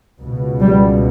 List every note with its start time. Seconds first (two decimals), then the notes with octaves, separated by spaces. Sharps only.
0.19 C#2 B2
0.60 G3